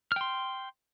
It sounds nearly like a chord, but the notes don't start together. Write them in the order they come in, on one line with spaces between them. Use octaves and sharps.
F6 G5 C6